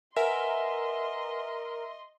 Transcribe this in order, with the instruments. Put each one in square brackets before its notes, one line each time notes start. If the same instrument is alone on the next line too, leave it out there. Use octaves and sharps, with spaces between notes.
[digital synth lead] A#4 [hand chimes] B4 F#5 G#5 [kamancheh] D#5 C6 [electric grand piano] E5